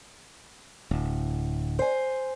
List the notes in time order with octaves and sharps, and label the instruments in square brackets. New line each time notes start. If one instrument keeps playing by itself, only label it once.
[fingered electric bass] D1
[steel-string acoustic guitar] C5 G#5